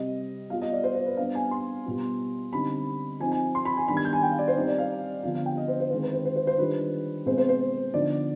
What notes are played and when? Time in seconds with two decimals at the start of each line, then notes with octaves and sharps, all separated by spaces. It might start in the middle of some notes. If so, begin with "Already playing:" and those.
Already playing: C3 G3 C4 D#5
0.50 G3 B3 F4 F5
0.62 D#5
0.72 D5
0.84 C5
0.95 C5
1.06 B4
1.17 G3 B3 D4 F5
1.35 G#5
1.51 C6
1.86 B2 G3 B3 F4
2.52 D3 G3 C4 D#4 B5
3.20 F3 C4 D#4 G#5
3.32 G#5
3.55 C6
3.65 B5
3.77 G#5
3.88 D#3 G3 B3 D4 B5
3.97 G#6
4.05 G6
4.13 G#5
4.22 G5
4.31 F5
4.39 D5
4.48 C5
4.56 G3 C4 D#4
4.68 D5
4.78 F5
5.23 D3 F3 B3 D4 F5
5.35 F5
5.46 G5
5.57 D#5
5.68 C5
5.80 C5
5.91 D#3 G#3 C4 C5
6.02 B4
6.13 C5
6.25 C5
6.36 C5
6.47 C5
6.58 D#3 G3 D4 F4 B4
7.26 B2 G#3 C4 C5
7.38 C5
7.49 C5
7.94 D3 F3 B3 D#4 D5